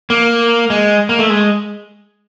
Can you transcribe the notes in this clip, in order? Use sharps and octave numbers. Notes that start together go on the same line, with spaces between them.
A#3
G#3
A#3
A3
G#3